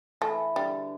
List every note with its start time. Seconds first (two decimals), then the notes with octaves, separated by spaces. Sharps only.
0.21 E3 A3
0.56 D3 G3